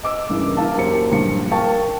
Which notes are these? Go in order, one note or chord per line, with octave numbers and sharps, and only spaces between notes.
D#5 D6 E6
G2 C#3 E3 A#3
E4 A#4 F5 A5
F#2 A#3 G4 C5 C#7
A#1 G2 C#7
A#4 F5 G5 A5 C#6